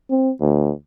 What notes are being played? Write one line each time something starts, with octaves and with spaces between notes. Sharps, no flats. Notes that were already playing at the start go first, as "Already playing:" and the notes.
C4
D2